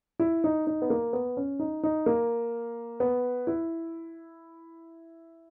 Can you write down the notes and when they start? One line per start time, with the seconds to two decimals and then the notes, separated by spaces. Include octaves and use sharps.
0.19 E4
0.44 D#4
0.67 D#4
0.82 B3
0.90 A#3
1.13 B3
1.37 C#4
1.59 D#4
1.83 D#4
2.06 A#3
3.00 B3
3.47 E4